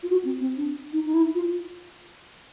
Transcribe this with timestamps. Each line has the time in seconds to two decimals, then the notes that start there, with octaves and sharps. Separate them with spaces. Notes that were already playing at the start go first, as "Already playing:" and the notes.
0.03 F4
0.10 F#4
0.25 C4
0.41 C4
0.57 D4
0.93 D#4
1.05 D#4
1.14 E4
1.35 F4